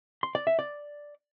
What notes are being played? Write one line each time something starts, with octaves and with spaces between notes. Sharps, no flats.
C6
D5
E5
D5